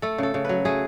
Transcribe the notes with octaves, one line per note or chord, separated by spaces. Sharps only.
A3 A4
C#3 A4
C#3
F#3 B4
A3 G#4